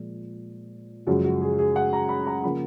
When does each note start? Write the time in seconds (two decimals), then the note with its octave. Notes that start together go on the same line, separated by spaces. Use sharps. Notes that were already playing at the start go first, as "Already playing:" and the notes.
Already playing: A#2 F3 G#3
1.07 F#2 C#3 F3 G#3 F#4
1.24 F#4
1.41 G#4
1.58 G#4
1.76 F#5
1.93 A#5
2.09 B5
2.27 A#5
2.43 C#3 F3 A#3 B5